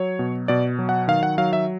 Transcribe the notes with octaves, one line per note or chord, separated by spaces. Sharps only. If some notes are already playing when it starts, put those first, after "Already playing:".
Already playing: F#3 C#5
B2
B2 D5
F#3
F#5
D#3 F5
F#5
F#3 F5
E5